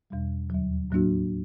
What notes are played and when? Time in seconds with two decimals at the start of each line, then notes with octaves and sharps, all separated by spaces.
0.10 E2 B2 G3
0.50 D#2 D3 F#3
0.91 A2 F#3 A#3 D4 F#4